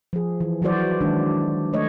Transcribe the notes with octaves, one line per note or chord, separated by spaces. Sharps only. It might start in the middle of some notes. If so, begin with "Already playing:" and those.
F3 G#4
E3
E3 F#3 F#4 C5 D5
D#3 G#3 D4
A3 C#5 D#5